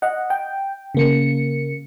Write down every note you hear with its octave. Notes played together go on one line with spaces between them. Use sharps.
D#5 F#5
G5
C#3 A#3 C#7